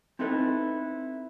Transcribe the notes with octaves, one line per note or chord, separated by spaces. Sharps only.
C4 D#4 E4 A4 B4